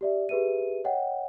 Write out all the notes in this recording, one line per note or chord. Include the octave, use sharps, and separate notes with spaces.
G4 D5 E5
G4 G#4 B4 E5 D#7
C#5 D#5 F#5 G5